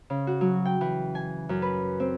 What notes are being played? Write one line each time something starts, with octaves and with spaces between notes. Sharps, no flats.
C#3
F#4
F#3
G5
E3
G#5
F#2
B4
C4